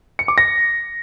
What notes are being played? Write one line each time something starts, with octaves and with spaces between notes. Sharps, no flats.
C#7
D6
A#6